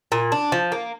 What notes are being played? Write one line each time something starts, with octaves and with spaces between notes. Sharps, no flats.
A#2
D4
F3
A#3